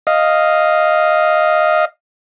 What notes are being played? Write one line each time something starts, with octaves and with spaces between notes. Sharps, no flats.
D#5 F5